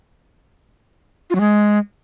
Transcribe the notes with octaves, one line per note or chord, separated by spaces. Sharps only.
F4
F#3
G#3